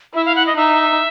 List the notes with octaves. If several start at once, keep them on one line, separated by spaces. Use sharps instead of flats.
E4 E5
F5
F#5
D#5
D#4 E5